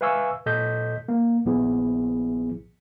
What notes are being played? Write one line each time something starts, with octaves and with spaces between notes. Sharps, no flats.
B4 E5 F5 G#5 C#6 E6
A#2 A4 D#5 G6 B6
A#3
A#1 F3 B3 E4 G#4